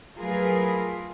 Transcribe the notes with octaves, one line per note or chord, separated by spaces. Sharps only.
F#3 A3 F4 G#4 A#4 B4